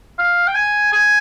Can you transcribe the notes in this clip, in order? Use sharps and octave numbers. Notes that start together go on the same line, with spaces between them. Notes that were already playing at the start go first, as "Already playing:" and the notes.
F5
G5
G#5
G#5